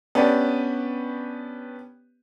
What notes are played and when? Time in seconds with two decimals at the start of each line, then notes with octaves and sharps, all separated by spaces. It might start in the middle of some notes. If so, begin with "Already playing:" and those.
0.15 B3 C#4 D4 G4 B4 D5